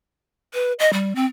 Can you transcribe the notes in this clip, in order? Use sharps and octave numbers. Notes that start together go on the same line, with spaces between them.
B4
D#5
G3
C4